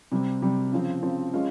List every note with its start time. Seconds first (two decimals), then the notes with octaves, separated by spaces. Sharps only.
0.12 C3 G3 C4
0.42 C3 G3 C4
0.72 C#3 F3 C4
1.02 C#3 F3 C4
1.33 G#3 C#4 F4